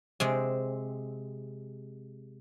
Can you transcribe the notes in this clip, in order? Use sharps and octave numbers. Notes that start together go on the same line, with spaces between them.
C3 G#3 C4